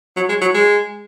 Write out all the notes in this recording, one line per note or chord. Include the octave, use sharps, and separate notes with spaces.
F#3
G#3
F#3
G#3